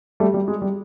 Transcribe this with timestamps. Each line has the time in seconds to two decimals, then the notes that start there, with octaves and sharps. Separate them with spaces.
0.20 G3 A3
0.34 G3
0.48 G#3
0.62 G3